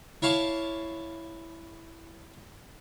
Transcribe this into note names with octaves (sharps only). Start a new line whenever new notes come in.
E4 C#5 F5 A5 D6